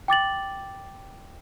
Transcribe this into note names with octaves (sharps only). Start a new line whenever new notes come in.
G5 D6 A6 F#7